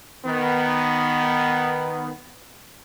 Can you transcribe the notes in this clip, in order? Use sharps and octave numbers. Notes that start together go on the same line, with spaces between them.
D#3 B3